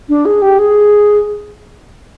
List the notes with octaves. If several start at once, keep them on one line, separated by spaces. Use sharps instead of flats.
D4
G#4
G4
G#4